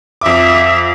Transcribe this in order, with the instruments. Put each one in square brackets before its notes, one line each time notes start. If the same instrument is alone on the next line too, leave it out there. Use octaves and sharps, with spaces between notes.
[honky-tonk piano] F2 D6 [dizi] E5